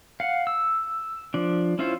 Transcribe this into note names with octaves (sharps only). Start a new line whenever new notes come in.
F5 F#5
E6
F3 D4
C#4 E4 F4 C5